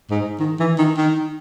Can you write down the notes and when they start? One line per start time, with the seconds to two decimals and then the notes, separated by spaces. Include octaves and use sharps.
0.10 G#2
0.40 D#3
0.60 E3
0.78 D#3
0.97 D#3